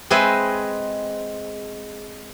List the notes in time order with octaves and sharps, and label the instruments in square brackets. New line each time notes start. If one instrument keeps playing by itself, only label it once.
[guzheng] G#3 C4 G#4 B4 D#5 E5